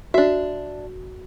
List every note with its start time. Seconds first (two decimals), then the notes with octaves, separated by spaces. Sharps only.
0.14 D4 F#4 E5